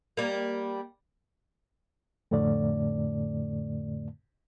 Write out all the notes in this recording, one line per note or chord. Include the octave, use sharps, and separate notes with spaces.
G3 A#3
F2 A2 D3 A3 D5